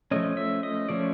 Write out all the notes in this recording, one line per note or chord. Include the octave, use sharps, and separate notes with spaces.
F3 A3 C#4 D#5
E5
D#5
F3 A3 C#4 D5